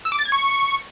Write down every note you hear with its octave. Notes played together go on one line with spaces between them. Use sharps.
E6
D6
A6
G#6
C#6